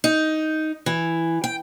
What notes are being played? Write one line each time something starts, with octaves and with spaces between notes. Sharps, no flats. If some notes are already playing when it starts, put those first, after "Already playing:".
D#4
E3
G5